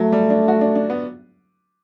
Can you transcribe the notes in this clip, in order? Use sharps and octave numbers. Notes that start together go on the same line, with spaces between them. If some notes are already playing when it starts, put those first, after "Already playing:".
Already playing: F#3 A3
G3
D4
F#4
D4
D4
B3